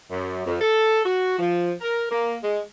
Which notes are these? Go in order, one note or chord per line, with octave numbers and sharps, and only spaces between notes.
F#2
F2
A4
F#4
F3
A#4
A#3
G#3